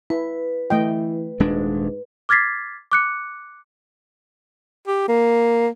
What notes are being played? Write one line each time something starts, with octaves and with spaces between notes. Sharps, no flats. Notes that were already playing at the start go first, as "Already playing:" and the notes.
E4 B4
E3 A3 D#5 G5
D#1 G#2 G#3 D4
D6 F6 G#6 A6 B6 C7
D6 F#6 C#7
G4
A#3